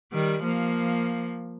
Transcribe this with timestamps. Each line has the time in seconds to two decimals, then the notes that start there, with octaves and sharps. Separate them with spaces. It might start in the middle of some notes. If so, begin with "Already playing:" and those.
0.13 D#3 G3
0.43 F3 A#3